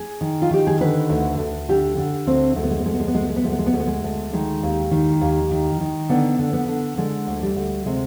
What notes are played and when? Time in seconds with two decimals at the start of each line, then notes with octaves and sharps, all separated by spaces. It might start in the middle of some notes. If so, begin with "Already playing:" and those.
Already playing: G#4
0.21 D#3
0.42 F4
0.51 D#3 G4
0.67 G#4
0.81 D3 B4
1.10 D2
1.38 D2
1.69 D3 G4
1.98 D3
2.27 D2 C4
2.56 D2 G#3
2.63 B3
2.71 G#3
2.79 B3
2.86 D2 G#3
2.93 B3
3.00 G#3
3.08 B3
3.14 D2 G#3
3.22 B3
3.30 G#3
3.36 B3
3.44 D2 G#3
3.52 B3
3.59 G#3
3.66 B3
3.73 D2 G#3
3.80 B3
3.87 G#3
4.04 D2
4.33 D#3 G#3
4.63 D#2
4.91 D#3
5.21 D#2
5.51 D#3
5.80 D#3
6.09 D3 B3
6.39 D3
6.53 B3
6.68 D3
6.98 D3 G#3
7.27 D2
7.42 G3
7.56 D2
7.86 C3 G#3